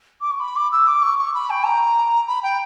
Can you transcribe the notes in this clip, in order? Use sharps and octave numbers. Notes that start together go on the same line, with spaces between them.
D6
C#6
B5
D6
E6
D6
C#6
C#6
B5
G5
A#5
B5
G5